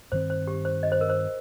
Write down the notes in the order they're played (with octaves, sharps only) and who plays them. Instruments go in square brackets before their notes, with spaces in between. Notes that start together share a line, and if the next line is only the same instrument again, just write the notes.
[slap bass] G2 D#3 C4 [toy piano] C5
[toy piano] C5
G4
C5
D#5
C5
A#4
C5